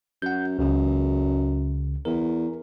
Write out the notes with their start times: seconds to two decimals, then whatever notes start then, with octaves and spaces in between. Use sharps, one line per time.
0.22 F#2 F#5 G6
0.59 C#2 F#2 C#3
2.05 E2 A#4